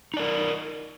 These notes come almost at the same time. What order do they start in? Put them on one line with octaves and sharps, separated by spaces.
D#4 D5 A#4